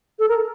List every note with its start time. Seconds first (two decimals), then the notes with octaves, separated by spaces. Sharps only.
0.19 A4
0.29 A#4